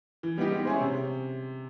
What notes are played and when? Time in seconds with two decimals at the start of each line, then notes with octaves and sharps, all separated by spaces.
0.23 E3
0.38 G3 B3 D#4 G4
0.51 G#3
0.65 C#4 E4 G#4 C5
0.80 C3